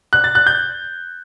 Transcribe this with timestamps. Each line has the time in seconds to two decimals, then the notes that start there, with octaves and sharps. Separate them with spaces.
0.13 F#6
0.24 A6
0.35 F#6
0.47 G6